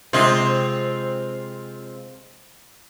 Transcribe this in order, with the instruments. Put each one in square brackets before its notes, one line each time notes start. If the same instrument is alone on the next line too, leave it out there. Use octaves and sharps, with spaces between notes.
[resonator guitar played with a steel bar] C3 G#3 C5 [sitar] C4 F4